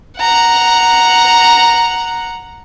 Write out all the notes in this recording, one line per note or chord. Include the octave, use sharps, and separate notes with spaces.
F#5 A#5